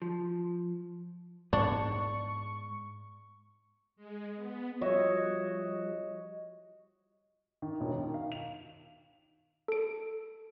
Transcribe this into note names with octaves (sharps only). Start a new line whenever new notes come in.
F3
G#2 G#3 B3 D4 C#6
G#3
B3
F3 G3 F#4 C#5 D#5 E5
D#3
E1
D#3
F5
F7
A4 D7